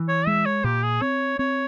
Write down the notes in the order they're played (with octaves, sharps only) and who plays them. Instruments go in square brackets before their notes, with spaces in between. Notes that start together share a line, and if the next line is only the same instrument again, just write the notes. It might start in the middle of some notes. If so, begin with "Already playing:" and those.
Already playing: [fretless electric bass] E3
[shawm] C#5
[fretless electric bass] G#3 [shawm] E5
[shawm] C#5
[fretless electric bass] A#2 [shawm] G4
[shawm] G#4
[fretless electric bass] C4 [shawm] C#5
[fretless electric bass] C4 [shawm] C#5